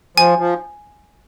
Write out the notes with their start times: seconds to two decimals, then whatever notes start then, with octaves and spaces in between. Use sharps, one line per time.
0.17 F3 G#5
0.38 F3